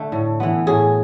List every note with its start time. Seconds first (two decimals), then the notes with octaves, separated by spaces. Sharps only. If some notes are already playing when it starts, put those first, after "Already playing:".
Already playing: D3 A3
0.12 A2
0.40 E3 B3
0.67 A2 G#4